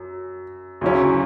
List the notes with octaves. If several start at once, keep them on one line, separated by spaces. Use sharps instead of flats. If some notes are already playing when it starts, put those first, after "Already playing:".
Already playing: F#2
D2 C#3 F#3 C#4 E4